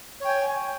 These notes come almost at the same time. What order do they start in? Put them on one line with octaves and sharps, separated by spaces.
C#5 G5 G#5